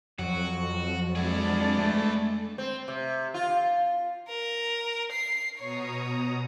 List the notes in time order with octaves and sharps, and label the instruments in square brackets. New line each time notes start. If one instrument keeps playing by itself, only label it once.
[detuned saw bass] F2 [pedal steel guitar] F#3 [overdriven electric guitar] F#4
[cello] G#3 D4 [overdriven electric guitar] E4 G#4
[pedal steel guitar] A3
[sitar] C4
C3
F4
[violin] A#4
C7
[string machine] B2 A#5 D#6 [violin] C#5